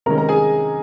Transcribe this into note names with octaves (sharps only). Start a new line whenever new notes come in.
C3 D#3 G#3 C#4 A#4 A#5
A#4 A#5
G#4 G#5